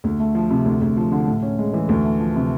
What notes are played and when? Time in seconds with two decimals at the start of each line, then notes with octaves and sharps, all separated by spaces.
0.04 D2
0.19 A3
0.35 F3
0.50 C3
0.65 D2
0.81 D2
0.97 F3
1.12 D3
1.27 A2
1.43 C#4
1.58 G#3
1.73 E3
1.89 D2
2.04 A3
2.20 F3
2.36 C3